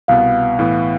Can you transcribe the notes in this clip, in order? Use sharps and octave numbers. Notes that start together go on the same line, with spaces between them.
C2 B2 B3 F5
A2 E3 B3